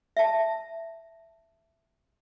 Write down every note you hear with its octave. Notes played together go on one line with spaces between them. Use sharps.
E5 A5